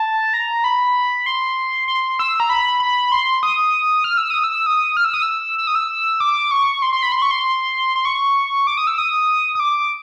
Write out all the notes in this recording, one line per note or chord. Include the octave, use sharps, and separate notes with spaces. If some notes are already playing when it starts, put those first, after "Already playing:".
Already playing: A5
A#5
B5
C6
C6
E6
A#5
B5
B5
C6
D#6
F6
E6
D#6
E6
D#6
F6
E6
D#6
E6
E6
D#6
E6
D6
C#6
C6
C6
B5
C6
C#6
C6
C6
C#6
D6
D#6
E6
D#6
D#6
D6